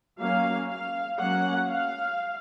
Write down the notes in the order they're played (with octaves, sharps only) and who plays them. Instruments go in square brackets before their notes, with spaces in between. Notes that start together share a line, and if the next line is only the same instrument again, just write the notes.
[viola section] F#3 A#3 C#4 F5
F5
F#3 A#3 C#4 F#5
F5